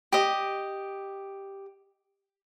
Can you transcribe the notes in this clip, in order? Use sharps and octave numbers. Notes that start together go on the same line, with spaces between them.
G4 D#5